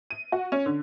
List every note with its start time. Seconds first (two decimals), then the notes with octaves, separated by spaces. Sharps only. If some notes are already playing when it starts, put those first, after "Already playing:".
0.10 D#7
0.32 F#4
0.52 C#4
0.66 D3